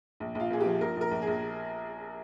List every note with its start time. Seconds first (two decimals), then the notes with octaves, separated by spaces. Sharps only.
0.20 A#1
0.35 A#1 F4
0.51 A#2 G#4
0.60 G4
0.66 F3
0.81 A#1 A#4
0.97 A#1 A#4
1.11 A#1
1.22 G#4
1.27 A#1